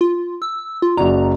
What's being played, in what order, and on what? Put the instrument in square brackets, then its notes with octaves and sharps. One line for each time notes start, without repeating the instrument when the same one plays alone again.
[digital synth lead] F4
E6
F4
[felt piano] F#1 F#4 D5 [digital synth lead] A#5